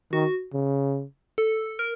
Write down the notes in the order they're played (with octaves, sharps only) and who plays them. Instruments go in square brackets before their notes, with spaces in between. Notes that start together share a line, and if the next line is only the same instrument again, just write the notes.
[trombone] D#3 [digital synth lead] F#4
[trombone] C#3
[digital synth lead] A4
A#4